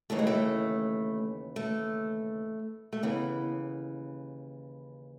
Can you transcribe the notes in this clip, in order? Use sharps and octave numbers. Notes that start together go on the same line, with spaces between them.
D#2 C#3 E3 A3
G#3
A3
A3
A3
D#2 C#3 E3 B3